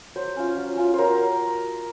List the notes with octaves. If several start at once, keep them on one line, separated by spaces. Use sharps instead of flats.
F#3 C5
C#4 F4
F#3
C#4 F4
F#3 A#4 C5